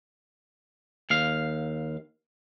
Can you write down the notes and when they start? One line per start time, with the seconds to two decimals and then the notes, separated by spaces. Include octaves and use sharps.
1.10 D#2 F5